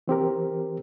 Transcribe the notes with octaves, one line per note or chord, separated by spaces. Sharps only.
E3 C4 G4 A#4